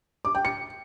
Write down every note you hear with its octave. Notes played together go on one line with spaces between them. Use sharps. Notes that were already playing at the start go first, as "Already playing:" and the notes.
D6
G5
C#7